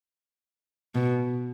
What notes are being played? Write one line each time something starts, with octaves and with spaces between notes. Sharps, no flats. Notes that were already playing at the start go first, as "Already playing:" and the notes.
B2